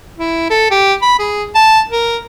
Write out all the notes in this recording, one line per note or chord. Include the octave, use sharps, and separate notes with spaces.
E4
A4
G4
B5
G#4
A5
A#4